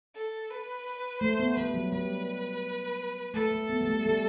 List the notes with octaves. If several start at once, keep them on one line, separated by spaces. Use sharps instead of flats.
A4
B4
A3 C5
B3
G3 B4
F#3
G3 B4
A3 A4
A3
B3
G3
A3
G3